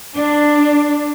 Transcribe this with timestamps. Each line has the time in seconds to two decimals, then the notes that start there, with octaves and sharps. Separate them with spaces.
0.15 D4